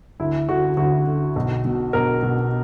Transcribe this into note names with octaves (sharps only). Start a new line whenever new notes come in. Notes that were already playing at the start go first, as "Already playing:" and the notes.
D2 E4
D3 F#4
D2 F#4
D3
B1
B2
B1 A#4
B2